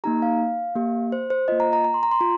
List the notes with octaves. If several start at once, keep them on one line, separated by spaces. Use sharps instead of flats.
A#3 D#4 G4 A#5
F5
A#3 G4
C5
C5
A#3 F4 D#5
A#5
A#5
A#5
C6
A#5
C6
F4 A#5